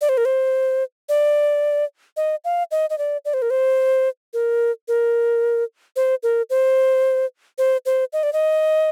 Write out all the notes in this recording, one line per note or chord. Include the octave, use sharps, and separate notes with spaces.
D5
C5
A#4
C5
D5
D#5
F5
D#5
D#5
D5
D5
C5
A#4
C5
A#4
A#4
C5
A#4
C5
C5
C5
D#5
D5
D#5